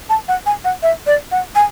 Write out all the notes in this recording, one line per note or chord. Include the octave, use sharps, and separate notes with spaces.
A5
F#5
G#5
F#5
E5
D5
F#5
G#5